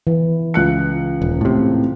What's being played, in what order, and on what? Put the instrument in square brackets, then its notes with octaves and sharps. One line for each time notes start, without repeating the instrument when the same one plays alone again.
[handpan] E3
[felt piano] C#2 F#6 C#7
[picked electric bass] D#1
A2 C3